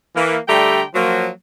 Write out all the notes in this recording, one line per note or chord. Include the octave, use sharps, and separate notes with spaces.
E3 A#3
D3 G3 A3 G4 G5 A#5
F3 F#3 A#3